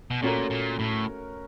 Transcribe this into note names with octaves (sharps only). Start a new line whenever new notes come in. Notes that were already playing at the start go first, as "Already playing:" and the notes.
B2
A#2 A3 C#4 F#4 A#4
A#2
A2